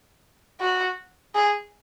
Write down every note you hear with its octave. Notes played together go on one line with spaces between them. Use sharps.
F#4
G#4